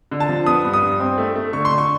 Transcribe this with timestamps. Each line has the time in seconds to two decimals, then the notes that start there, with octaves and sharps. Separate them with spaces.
0.11 D3
0.20 A5
0.29 F3
0.46 B3 D#6
0.65 G2
0.74 D#6
0.82 G2
1.00 C4
1.18 A3
1.36 A3
1.53 D3 C#6
1.65 C6
1.71 D3
1.78 C#6